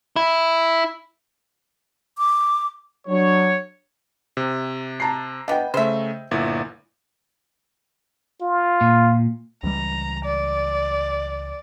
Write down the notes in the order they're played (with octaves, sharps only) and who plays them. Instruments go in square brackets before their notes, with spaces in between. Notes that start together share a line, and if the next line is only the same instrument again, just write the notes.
[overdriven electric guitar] E4
[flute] D6
[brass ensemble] F#3 D4 C#5
[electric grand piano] C3
[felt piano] A5 A#5 C7
[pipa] B3 D4 [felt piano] D#5 G5
[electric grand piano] C#3 A3 [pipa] C5 E5
[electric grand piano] G1 A#2 E4
[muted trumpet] F4
[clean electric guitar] A#2
[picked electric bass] C#2 E3 G3 [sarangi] A#5
[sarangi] D5